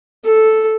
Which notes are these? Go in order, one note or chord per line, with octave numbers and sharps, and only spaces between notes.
A4